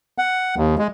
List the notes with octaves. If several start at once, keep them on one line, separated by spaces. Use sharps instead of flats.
F#5
D#2
G#3